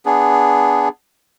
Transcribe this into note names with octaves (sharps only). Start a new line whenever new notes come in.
B3 D4 G#4